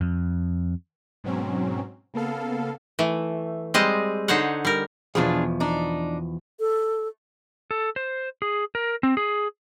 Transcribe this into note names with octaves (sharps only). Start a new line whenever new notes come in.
F2
G#2 B2 F#3 C4 C#4
C#3 A#3 B3 A4 F5
E3 A3
G3 G#3 C4 D#5
D3 D#4 C5 C#5 F#5
G3 A#4
E2 B2 F3 D4 F4 G#4
D4 D#4
A4
A4
C5
G#4
A#4
C4
G#4